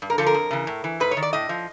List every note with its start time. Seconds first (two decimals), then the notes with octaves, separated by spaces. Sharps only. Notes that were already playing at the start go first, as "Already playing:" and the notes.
0.02 G2
0.10 A#4
0.18 D3 F3 A4
0.26 A#4
0.34 F2
0.51 C#3 E3
0.67 A2
0.84 E3
1.00 G#2 B4
1.11 C#5
1.17 D#3
1.22 D5
1.33 A2 D#5
1.49 F3